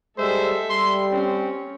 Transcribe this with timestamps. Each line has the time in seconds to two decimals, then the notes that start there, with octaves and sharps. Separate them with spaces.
0.18 G3 G#3 A4 C5 E5
0.70 G3 C6
1.12 C4 C#4